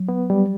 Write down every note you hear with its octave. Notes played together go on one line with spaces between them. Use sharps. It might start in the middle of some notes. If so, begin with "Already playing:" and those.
Already playing: F#3
B3
G3